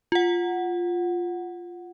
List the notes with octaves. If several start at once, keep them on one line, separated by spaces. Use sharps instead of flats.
F4 F#5